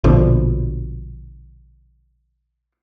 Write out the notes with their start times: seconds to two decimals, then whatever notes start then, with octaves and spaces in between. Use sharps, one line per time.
0.04 A#1 B2 D3 F3